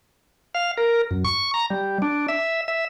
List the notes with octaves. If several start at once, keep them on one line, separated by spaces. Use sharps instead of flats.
F5
A#4
F#2
C#6
A#5
G3
D4
E5
E5